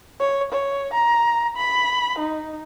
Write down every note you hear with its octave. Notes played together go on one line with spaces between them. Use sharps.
C#5
C#5
A#5
B5
D#4